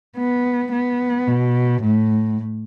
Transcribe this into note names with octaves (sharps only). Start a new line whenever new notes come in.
B3
B3
B2
A2